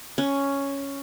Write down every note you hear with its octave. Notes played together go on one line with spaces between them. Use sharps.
C#4